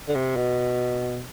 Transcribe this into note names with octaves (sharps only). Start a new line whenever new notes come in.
D3
C3
B2